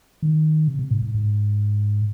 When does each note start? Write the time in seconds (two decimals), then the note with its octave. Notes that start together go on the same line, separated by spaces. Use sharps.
0.22 D#3
0.68 C3
0.79 C3
0.91 G#2
1.02 G#2
1.14 G#2